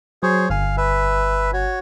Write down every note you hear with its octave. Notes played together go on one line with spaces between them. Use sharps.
F#3 G#4 C5 C#5
G1 F5 G#5
B4 E5
F#4 C#5